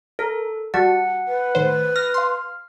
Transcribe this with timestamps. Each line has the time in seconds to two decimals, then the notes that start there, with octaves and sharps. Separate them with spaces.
0.19 A4 A#4
0.74 G3 F#4 F#5 A5
1.28 B4
1.55 A2 D#3 C5
1.96 F6 A#6
2.14 F5 C6